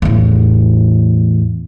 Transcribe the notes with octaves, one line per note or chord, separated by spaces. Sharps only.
E2 A2